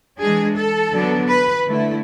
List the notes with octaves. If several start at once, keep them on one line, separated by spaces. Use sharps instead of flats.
E3 G#3 D4 G#4
A4
D3 F#3 B3 D4
B4
D3 A3 E4